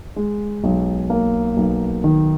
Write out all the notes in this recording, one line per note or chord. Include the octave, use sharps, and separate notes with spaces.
G#3
B1
A#3
B1
D#3